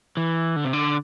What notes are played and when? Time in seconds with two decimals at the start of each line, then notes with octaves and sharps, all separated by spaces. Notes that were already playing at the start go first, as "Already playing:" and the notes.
0.17 E3
0.56 D3
0.65 C3
0.73 D3